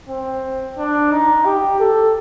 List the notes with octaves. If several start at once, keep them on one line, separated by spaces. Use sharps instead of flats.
C4
D4
D#4
G4
A4